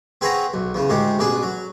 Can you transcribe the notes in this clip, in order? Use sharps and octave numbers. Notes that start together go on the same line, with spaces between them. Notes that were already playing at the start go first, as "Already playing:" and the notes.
C4 G#4 B4 C#5 F#5 A#5
B1
E2 C#3
D2 A2 G#3 G4
A1 B2 D4 G#4
F#3